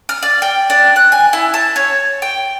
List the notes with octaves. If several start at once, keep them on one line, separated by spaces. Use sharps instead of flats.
F6
D5
G5
D4
F#6
G#5
E4
A5
C#5
G5